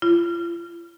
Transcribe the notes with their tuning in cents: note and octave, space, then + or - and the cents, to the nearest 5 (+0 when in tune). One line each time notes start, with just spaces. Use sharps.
F4 -40